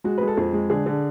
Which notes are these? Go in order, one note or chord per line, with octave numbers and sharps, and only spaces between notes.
G#3 F#4
G#3 B4
A4
F2 G#4
G#3
D3 G#4
D3